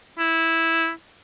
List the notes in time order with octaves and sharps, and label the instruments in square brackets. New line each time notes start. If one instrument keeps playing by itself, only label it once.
[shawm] E4